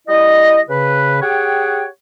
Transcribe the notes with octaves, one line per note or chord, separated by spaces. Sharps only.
G3 E4 D#5
C#3 B4
G4 G#4 C#5 F#5 G5